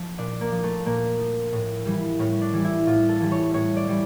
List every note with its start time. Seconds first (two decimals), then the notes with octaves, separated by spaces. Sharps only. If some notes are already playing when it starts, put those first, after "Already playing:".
Already playing: F3
0.18 A#2 D4
0.41 A#3
0.52 F3
0.63 A3
0.86 A#2 A#3
1.20 F3
1.53 A2
1.86 E3 G3
2.19 A2 C#4
2.42 D4
2.53 E3 G3
2.65 E4
2.87 A2 F4
3.09 A4
3.20 E3 G3
3.32 C#5
3.54 A2 C#5
3.77 D5
3.87 E3 G3